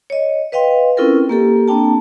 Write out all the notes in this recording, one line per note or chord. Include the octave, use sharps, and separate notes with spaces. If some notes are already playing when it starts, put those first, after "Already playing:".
C#5 D#5
B4 D#5 F5 G5 C6
C4 C#4 E4 F4 A4 A#4
A#3 G4 A4
A#3 C4 D4 G5 A5